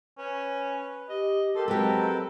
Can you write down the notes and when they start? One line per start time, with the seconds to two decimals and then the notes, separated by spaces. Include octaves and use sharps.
0.18 C#4 B4
1.09 G4 D#5
1.56 G4 A4 A#4 C6
1.68 F#3 G#3 C4 G4 A#4 B4